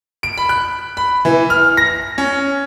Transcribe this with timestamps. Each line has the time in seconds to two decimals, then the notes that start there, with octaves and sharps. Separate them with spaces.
0.23 D7
0.37 B5
0.49 F#6
0.97 B5
1.25 E3
1.50 F6
1.77 A#6
2.18 C#4